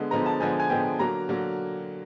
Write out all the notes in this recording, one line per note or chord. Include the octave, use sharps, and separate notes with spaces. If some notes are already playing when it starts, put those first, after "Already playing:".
Already playing: D3 G#3 B3
D3 F3 G#3 B3 A#5
A5
D3 F3 G#3 B3 G#5
G#5
D3 F3 G#3 B3 G5
D3 F#3 A#3 A#5
D3 F#3 A#3